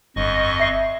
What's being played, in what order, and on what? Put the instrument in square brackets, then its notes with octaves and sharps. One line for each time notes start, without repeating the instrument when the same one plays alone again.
[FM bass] G1 [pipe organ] F2 D#5 C#6
[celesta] E5 C7